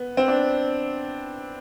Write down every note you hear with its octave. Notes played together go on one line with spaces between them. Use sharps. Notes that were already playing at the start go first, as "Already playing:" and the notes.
Already playing: B3
C4
D4